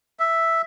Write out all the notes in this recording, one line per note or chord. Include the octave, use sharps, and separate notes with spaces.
E5